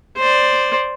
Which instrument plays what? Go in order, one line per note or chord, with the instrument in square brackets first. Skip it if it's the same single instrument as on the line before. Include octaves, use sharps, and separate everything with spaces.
[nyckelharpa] C5 D5